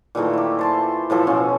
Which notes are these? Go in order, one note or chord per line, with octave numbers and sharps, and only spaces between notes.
A#2 D#3 E3 A3
E4 G4
C5 A5 C6
A2 E3 F3 A4
B2 C#4 F4